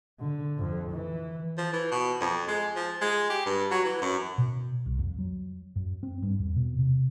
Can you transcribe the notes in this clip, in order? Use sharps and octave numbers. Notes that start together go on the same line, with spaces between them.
D3
F2
E3
F3
E3
B2
F2
G#3
F3
G#3
G4
G2
F#3
E3
F#2
B2
C2
F2
F#3
F#2
C4
G2
E2
B2
C3